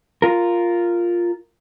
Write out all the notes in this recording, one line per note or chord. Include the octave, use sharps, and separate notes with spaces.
F4 A#4